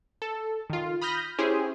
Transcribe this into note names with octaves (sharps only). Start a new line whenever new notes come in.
A4
D#3 F4
B5 D#6 F6 G6 A#6
C#4 E4 G4 G#4 C5